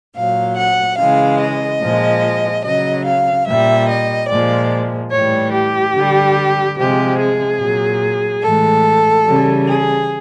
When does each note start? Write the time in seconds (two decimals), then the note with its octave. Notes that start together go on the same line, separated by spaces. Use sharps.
0.17 A#2 F#3 F5
0.57 F#5
1.00 C#3 E3 G#3 F5
1.40 D#5
1.82 A#2 F3 G#3
2.65 C#3 F#3 D#5
3.06 F5
3.48 A#2 G3 E5
3.89 D#5
4.30 A#2 F3 G#3 D5
5.12 A2 E3 G3 C#5
5.54 G4
5.95 D3 G3
6.78 C3 F3 G#3 G4
7.20 G#4
7.61 A#2 F#3
8.43 A2 E3 G#3 A4
9.26 C#3 E3 G3
9.67 G#4